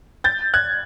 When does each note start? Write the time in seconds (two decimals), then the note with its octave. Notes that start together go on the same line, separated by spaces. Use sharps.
0.24 G6 A6
0.54 F#6 G#6